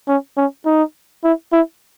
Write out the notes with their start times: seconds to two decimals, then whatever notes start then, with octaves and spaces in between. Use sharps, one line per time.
0.08 C#4
0.37 C#4
0.65 D#4
1.24 E4
1.52 E4